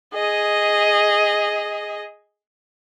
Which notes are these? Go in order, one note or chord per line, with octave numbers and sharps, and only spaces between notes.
G#4 D#5